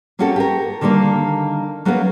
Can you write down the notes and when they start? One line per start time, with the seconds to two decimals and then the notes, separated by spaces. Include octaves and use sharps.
0.19 A#3 C4 C#4 F#4 G4 A4
0.36 G4 G#4 A#4
0.81 D3 D#3 G3 A3 A#3
1.85 F#3 A#3 B3 C#4 A4 B4